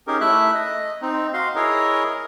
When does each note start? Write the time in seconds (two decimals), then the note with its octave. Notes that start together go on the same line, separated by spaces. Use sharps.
0.07 C#4 D#4 G4 G#4 A#4
0.21 A3 E4 E5 F#6
0.54 D#5
1.02 C4 D#4
1.34 F#4 D#5 F5 C6
1.55 E4 G#4 A#4 C#5 D#5